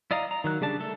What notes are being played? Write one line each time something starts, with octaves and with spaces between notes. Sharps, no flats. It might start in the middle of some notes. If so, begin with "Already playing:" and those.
E4 D5 D#5 F5 A#5
A#5
D#3 F#3 F#6
C#3 G3 D4 A5
A3 A4